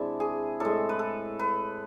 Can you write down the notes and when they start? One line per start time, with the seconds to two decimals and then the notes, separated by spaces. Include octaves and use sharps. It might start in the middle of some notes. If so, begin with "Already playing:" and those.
Already playing: C3 G#3 D4 E4
0.20 G#4
0.60 A2 G#3 A4
0.89 B4
0.99 A4
1.39 B4